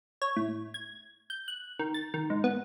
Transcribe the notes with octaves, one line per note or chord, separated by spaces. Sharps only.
C#5
A2
G#6
G6
F#6
D#3
A6
D#3
G#2
B3